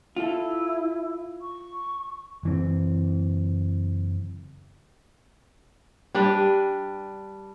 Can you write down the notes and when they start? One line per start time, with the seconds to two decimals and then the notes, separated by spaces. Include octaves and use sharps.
0.16 E4 F4 A4
1.42 C#6
2.43 F#1 E3 C4
6.15 G3 D4 B4